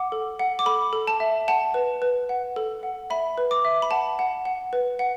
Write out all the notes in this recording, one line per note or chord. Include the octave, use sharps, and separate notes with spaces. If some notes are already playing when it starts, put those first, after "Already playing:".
Already playing: F#5 D6
A4
F#5
D6
A4 B5
A4
A5
E5
F#5 A5
B4
B4
F#5
A4
F#5
E5 B5
B4
D6
E5
B5
F#5 A5
F#5
F#5
B4
F#5